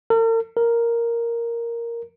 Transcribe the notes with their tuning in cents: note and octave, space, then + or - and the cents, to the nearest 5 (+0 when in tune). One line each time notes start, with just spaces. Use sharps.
A#4 -45
A#4 +0